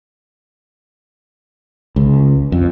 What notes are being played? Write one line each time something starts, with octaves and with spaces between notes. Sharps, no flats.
C#2
F2